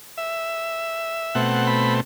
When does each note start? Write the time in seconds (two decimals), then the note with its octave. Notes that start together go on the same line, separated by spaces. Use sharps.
0.18 E5
1.35 B2 A3 C4 F#5
1.67 B5